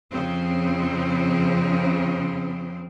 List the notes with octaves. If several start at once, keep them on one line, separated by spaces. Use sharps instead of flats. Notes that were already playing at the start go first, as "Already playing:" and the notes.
F2 C#3 C4